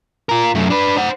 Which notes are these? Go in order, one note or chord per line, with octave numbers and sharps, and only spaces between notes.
F4 A#4
F#2 A3
D4 B4
C5 F#5